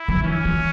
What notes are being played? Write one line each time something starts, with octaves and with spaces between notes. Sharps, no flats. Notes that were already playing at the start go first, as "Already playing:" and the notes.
Already playing: E4
F#3
E3 C#4
E3